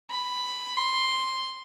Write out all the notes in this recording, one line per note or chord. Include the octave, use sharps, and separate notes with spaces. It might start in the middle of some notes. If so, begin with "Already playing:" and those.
B5
C6